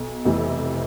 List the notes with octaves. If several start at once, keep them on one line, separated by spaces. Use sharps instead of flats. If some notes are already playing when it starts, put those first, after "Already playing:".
Already playing: B1 B2
F1 F2 C3 E3